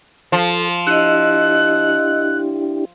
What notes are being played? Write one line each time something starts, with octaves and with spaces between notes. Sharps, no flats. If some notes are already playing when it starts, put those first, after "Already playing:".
F3 A4
D4 E4 G4 D#5 E6 F#6